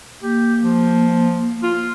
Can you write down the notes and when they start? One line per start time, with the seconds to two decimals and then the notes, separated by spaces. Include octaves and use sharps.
0.23 A#3 G4
0.62 F3
1.63 F4